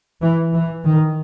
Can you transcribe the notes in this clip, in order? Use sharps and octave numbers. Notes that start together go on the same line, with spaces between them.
E3
E3
D#3